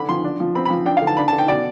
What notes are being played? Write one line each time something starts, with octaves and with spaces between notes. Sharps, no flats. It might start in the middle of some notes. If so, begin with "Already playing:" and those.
Already playing: D3 B5
F3 C6
D4
F3
C4 B5
B5
F3
D4 G5
F5
D3
A5
D4 B5
A5
D3
G5
B2 D5